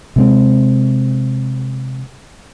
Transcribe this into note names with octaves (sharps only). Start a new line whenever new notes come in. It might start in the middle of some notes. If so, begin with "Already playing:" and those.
C3 G#3 C4